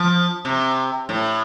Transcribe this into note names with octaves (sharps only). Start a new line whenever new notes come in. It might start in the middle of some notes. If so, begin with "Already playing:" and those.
Already playing: F3
C3
A2